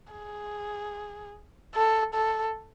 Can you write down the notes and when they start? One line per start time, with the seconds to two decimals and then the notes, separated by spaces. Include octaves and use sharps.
0.13 G#4
1.75 A4
2.14 A4